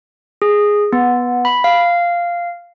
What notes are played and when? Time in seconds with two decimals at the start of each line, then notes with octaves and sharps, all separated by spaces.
0.42 G#4
0.93 B3
1.45 B5
1.64 F5